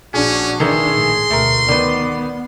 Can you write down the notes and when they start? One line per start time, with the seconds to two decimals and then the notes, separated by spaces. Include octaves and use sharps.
0.14 A#1 C#4 D4 F#4 G#4
0.60 D#3 E3 D#4 G#4 C6
0.95 A#1 A2
1.30 D2 B2 A3 A#4
1.69 D#3 B3 B4 D5